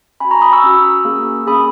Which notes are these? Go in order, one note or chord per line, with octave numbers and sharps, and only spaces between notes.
C#4 F#4 G#5 B5
A#5 C#6
B5 D#6
C#6 E6
C#4 F#4
A#3 C#4 G#4
A#3 C#4 G#4 B5 D#6